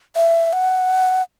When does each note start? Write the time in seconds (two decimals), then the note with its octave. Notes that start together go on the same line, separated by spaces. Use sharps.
0.16 E5
0.53 F#5